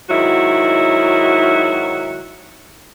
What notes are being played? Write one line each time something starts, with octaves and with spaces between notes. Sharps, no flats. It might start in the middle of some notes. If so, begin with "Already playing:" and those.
G#2 D#3 F#3 E4 F#4